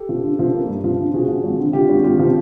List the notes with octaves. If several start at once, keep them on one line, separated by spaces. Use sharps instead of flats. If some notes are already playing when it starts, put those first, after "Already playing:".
Already playing: G4 A4
F3
D3
F3
A#3
G2
F3
D3
F3 F#4 G#4
F3
G#1
D3
D3 F4 G4
G#1
G#1 F4 G4
F3